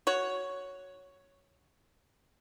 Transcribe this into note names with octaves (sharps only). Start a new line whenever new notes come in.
F#4 C#5